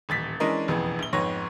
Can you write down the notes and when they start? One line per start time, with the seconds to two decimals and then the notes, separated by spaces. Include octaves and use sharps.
0.09 D#1 A1 A6 B6
0.40 E3 G#3 C#4 D4 A#4 D#5
0.68 E1 A1 F2 E3 B3 G#4
0.99 A#1 G7
1.13 F2 G#2 B3 C#5 A#6